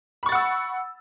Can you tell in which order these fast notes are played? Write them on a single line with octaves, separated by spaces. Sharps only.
B5 C#6 A6 F#5 E6